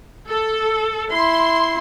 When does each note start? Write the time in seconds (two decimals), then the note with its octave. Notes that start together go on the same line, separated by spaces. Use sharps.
0.27 A4
1.12 E4 C6